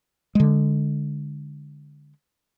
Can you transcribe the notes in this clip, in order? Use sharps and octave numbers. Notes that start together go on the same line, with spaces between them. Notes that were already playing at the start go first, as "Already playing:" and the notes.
D3 G#3